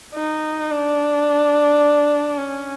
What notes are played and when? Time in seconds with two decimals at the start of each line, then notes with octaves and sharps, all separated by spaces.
0.15 D#4
0.71 D4
2.38 C#4